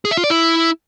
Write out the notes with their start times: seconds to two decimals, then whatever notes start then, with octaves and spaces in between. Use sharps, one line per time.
0.05 G#4
0.11 E5
0.17 F4
0.24 D5
0.30 E4